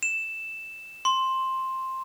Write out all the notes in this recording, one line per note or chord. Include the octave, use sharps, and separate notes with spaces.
E7
C6